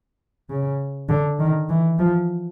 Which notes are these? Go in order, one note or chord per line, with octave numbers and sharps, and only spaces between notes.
C#3
D3
D#3
E3
F3